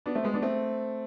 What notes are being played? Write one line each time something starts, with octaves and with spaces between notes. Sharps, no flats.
B3 D4
A3 C4
G#3 B3
B3 D4
A3 C4